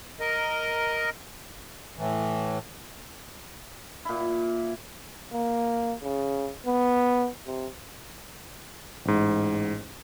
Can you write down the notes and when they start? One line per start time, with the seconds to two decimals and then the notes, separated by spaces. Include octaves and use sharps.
0.20 A#4 D#5
1.98 A2 E3
4.05 A#2 E4
5.32 A#3
6.03 C#3
6.66 B3
7.46 C3
9.05 A1 G#2